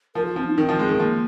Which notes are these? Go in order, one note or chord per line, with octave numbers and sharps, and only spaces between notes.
F3 A#4
F4
F3 C4
D#4
D#3 C4
F3
G#3
D#3
F3 A#3